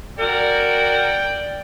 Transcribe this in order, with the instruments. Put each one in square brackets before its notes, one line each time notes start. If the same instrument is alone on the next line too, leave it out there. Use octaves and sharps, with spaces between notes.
[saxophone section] F#4 A#4 [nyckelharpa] D5 [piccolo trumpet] G5